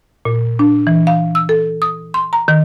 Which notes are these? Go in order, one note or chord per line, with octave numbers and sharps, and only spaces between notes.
A#2
D4
E3
F5
E6
A4
D#6
C6
A#5
D#3